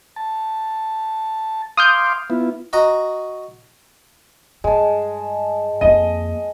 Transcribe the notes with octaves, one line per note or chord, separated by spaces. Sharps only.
A5
F5 C6 D6 D#6 F6 G6
B3 E4 F4
F#4 D#5 A#5
G2 G#3 A5
F2 A#3 D#5